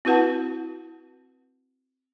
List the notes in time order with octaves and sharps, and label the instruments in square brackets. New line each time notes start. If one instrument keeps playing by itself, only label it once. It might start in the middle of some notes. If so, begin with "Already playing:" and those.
[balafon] C4 E4 F#4 B4 F#5 A5